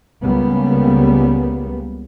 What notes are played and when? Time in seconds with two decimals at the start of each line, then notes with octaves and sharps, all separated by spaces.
0.23 C#2 C#3 G3 A#3 B3